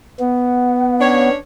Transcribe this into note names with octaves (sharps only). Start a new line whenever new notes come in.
B3 F#5
C#4 D4 C#5